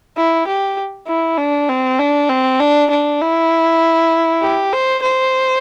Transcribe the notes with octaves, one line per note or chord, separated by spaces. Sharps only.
E4
G4
E4
D4
C4
D4
C4
D4
D4
E4
G4
C5
C5